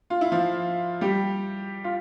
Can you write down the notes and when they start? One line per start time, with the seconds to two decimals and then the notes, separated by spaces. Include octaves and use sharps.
0.10 F4
0.21 E4
0.32 F3 F4
1.01 G3 G4
1.84 F4